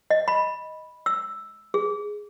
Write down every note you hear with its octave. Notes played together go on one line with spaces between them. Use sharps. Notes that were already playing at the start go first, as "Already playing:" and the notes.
D#5
B5
E6
G#4